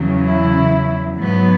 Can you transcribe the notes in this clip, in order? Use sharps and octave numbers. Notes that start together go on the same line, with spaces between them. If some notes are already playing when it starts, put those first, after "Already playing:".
Already playing: E2 C#3 F#3
E4
G#2 F#3 B3